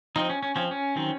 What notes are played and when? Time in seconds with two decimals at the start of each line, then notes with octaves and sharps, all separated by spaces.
0.16 F3 C4 D#4
0.29 C#4
0.43 C#4
0.56 F3 C4 C#4
0.71 C#4
0.96 D#3 F#3 C4